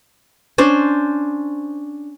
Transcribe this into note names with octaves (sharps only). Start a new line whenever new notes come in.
C#4 D4 C5